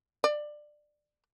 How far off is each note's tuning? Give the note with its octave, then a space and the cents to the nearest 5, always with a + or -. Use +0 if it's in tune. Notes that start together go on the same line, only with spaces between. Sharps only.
D5 +20